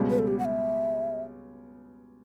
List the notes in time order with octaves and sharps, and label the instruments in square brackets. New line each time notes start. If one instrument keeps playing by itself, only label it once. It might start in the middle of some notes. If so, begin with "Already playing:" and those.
Already playing: [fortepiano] C#2 B2 G3
[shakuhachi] B4
A4
G4
F#5
E5